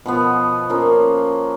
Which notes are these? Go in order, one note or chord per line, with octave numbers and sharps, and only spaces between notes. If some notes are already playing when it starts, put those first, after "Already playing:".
B2 F3 B3
F3 A#3 C#4